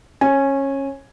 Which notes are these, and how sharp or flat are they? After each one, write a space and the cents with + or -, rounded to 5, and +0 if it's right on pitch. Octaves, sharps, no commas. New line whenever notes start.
C#4 -20 G#5 +0